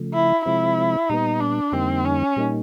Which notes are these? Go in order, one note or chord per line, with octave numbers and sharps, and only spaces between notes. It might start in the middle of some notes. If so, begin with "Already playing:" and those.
Already playing: C#3 F3 A3
E4
C3 F3 G#3 C4 E4
A#2 G3 B3 D#4
D4
F2 D3 G3 A#3 C4 D#4
C#4
A#2 G3 A#3 D#4